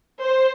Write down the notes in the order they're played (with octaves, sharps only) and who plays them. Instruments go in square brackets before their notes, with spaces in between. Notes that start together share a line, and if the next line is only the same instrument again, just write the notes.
[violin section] C5